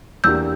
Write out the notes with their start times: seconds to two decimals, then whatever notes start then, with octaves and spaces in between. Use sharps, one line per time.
0.24 E2 E3 A#3 D4 G4 E6 G6